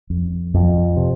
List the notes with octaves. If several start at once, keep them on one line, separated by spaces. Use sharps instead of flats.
F2
F2
C3